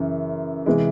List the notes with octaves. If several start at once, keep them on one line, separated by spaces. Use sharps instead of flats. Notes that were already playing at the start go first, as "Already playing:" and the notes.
Already playing: F#2 C#3 E3
C3 E3 G#3